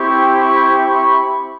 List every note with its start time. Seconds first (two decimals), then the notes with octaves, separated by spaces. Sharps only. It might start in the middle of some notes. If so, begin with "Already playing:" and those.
Already playing: C4 E4 G4 C#6
0.39 B5 C#6
0.86 B5 C#6